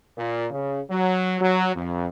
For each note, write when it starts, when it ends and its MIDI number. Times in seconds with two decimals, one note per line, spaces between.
0.17 0.46 46
0.51 0.81 49
0.89 1.37 54
1.40 1.73 54
1.75 2.07 41